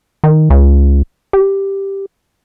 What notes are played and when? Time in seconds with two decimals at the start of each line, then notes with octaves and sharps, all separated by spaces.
0.24 D#3
0.50 C#2
1.33 G4